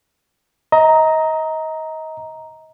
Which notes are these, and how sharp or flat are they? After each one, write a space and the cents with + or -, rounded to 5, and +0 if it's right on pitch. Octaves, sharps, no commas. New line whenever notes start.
D#5 +30 A#5 +0